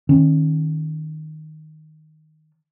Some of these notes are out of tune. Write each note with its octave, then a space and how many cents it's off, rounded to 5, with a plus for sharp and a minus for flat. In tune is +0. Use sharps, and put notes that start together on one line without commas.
D#3 +0 C#4 -25